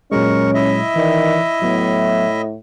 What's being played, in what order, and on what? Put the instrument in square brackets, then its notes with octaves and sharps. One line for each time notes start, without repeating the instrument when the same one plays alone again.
[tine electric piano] A#2 F#3 G#3 [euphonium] C#4 [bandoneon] A#4 C#6
[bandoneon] E4 D#5 E5
[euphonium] D#3 [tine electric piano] E3 D5
[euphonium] A2 [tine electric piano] F#3 B3